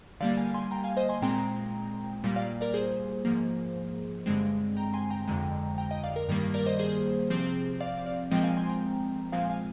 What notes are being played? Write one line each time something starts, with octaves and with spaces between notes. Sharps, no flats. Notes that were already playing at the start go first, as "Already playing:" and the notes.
D3 G3 A#3 D5 F5
F5 G#5
G#5 C6
G5 A#5
F5 G#5
C5 D#5
G#5 C6
A#2 G#3 C4 G5 A#5
A#2 G3 A#3
D5 F5
A#4 D5
G#4 C5
G#2 F3 A#3
G2 D3 G#3 C4
G5 A#5
G#5 C6
G5 A#5
F2 D3 G#3
G5 A#5
D#5 G5
D5 F5
A#4
G2 D#3 G3 A#3 A#4
A#4 D5
C5 D#5
G#4 C5
C3 F3 C4
D5 F5
D5 F5
A#2 F3 G#3 C4 D#5 G5
F5 G#5
G#5 C6
G5 A#5
A#2 F3 G#3 C4 F5 G#5
F5 G#5